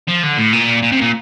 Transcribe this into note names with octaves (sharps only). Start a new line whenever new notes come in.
F3
D3
A2
A#2
A#2
C3
A#2